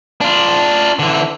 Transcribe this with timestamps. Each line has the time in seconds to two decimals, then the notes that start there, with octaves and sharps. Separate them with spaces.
0.21 D4 F4
0.99 D3 E3